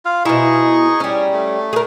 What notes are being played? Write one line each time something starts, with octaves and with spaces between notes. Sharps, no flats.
F4 F5
B2 D#4 E4 G#4 C#6
G3 C#4
A3
G#4 A#4